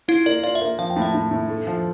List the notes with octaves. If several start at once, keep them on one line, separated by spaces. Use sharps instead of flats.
E4 F4
A#3 D5
F4 D5
E5
A#3
F3 F5
G5
A2
E5
A2
A2
A3
F3